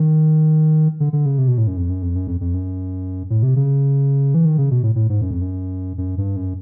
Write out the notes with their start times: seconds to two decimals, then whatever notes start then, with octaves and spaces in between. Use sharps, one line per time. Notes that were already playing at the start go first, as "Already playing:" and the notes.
Already playing: D#3
1.00 D3
1.13 D3
1.26 C#3
1.38 C3
1.48 B2
1.58 A2
1.67 F#2
1.77 F2
1.90 F#2
2.02 F2
2.16 F#2
2.27 F2
2.41 F2
2.54 F#2
3.30 A2
3.43 C3
3.56 C#3
4.34 E3
4.45 D#3
4.58 C#3
4.71 B2
4.83 A2
4.95 A2
5.09 G#2
5.21 F#2
5.31 F2
5.41 F#2
5.98 F#2
6.18 G2
6.36 F#2